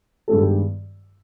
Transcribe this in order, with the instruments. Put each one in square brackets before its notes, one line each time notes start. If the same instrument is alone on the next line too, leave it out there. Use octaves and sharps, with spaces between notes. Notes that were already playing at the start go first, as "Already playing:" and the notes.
[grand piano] G2 D#3 G#3 B3 A4
G4